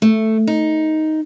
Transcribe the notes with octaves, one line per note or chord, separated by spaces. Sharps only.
A3
D#4